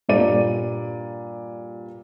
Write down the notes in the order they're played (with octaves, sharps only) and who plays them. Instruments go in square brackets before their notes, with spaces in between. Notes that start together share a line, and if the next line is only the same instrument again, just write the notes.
[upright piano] G2 A#2 D5 D#7